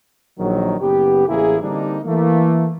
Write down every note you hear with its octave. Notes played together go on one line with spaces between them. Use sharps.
A#1 D#3 F#3
F#1 B3 G4
A1 A#3 E4 G#4
D3 G3 A#3 C4 D4 D#4
E3 A3 A#3